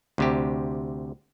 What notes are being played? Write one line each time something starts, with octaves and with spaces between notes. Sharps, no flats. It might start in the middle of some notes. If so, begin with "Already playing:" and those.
D2 C3 G4